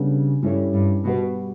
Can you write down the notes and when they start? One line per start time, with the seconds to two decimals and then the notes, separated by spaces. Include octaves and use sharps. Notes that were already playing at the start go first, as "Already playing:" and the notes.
Already playing: C#3 G3 B3 D4 A4
0.42 G2 G3 C#4 E4 A4 C#5
0.73 G2
1.05 B2 G3 B3 F#4 B4